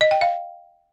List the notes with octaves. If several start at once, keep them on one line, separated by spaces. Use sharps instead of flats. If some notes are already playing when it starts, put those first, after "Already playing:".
D#5
G5
F5